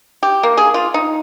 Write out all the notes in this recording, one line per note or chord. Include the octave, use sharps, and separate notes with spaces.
G4
A#3
G#4
F4
D#4